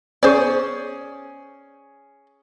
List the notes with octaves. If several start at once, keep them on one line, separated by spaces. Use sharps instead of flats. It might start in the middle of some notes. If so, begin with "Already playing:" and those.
C#4 G#4 C5 D5 C#6